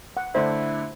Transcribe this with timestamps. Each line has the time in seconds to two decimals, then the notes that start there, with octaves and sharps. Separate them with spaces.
0.17 F#5
0.35 D3 A3 D4 E4 C5